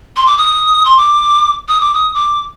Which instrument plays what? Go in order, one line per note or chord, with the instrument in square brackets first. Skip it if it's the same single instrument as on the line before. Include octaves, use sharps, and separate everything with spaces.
[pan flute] C6
D6
D#6
C6
D6
D#6
D6
D#6
D6